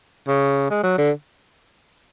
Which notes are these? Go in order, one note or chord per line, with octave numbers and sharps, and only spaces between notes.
C#3
G#3
F#3
D3